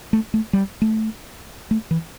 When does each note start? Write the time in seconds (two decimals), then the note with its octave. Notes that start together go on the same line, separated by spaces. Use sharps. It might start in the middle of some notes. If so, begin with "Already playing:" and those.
0.13 A3
0.34 A3
0.53 G3
0.82 A3
1.71 A3
1.91 E3